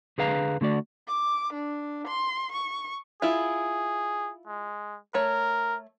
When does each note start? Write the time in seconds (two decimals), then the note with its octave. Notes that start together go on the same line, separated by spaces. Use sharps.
0.18 D3 G#4 B4 F5 A#5
0.61 D3 A3 F#4 D5
1.07 D6
1.53 D4
2.07 C6
2.52 C#6
3.22 E4 F4 G#4
4.47 G#3
5.14 A3 A#4 C#5